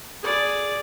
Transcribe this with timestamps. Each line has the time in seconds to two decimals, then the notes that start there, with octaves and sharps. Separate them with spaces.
0.23 G#4 D5